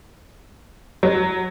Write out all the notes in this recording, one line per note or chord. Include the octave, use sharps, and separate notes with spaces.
F#3